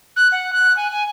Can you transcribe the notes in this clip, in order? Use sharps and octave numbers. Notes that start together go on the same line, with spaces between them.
F#6
F#5
F#6
G#5
G#5